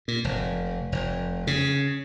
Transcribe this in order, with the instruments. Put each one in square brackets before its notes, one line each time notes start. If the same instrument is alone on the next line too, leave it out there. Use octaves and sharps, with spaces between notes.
[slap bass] A#2
F1
F1
C#3